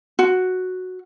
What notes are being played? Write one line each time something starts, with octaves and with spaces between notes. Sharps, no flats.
F#4